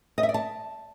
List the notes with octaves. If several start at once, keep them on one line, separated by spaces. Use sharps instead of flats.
D#5
E5
D5
A5